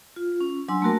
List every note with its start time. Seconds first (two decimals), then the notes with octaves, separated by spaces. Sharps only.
0.16 F4
0.41 C#4
0.68 F#3 D4 G#5 C6 E6
0.82 A3 A#3 F#4 A#4 A5